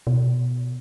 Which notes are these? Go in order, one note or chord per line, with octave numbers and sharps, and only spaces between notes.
B2